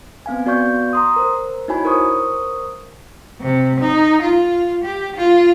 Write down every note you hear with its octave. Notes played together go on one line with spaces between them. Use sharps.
B3 C4 F5 G#5
B3 F#4 D5 F5 C#6 G6
A#5 C6 D#6
A#4 C5
D#4 E4 F#4 C#5 G#5 B5
A#4 C5 C#6 D#6
C3
D#4
F4
G4
F4